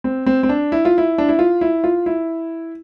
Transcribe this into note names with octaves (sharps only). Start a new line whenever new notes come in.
C4
C4
C4
D4
E4
F4
E4
D4
E4
F4
E4
F4
E4